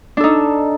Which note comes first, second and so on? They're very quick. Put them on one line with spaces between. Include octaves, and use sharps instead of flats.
D4 A4 D#4